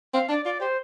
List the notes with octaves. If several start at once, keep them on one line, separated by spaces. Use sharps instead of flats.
C4 F5
D4 D5
F4 D5
G4 C5